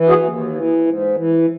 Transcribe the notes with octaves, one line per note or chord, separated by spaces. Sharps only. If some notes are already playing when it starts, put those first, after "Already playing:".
Already playing: E3
F#4 G#4
D#2
E3
G#2
E3